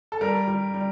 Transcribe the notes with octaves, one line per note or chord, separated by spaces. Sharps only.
A4
G3 A#4
G3
G3